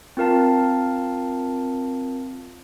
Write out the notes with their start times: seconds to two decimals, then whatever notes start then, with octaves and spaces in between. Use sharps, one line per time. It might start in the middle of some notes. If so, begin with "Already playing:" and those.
0.17 C4 F4 A#4 F5 A5